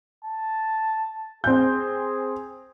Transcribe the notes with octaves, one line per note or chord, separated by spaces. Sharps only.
A5
C4 G#4 G6